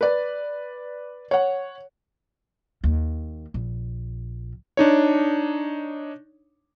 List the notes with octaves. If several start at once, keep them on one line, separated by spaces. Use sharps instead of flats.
B4 D5
C#5 F#5
D#2
A#1
D4 D#4 C#5